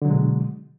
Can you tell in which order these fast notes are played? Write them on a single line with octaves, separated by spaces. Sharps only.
D3 F#3 B2 G#3